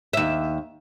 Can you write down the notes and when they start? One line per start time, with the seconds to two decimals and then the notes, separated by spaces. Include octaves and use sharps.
0.13 D#2 E5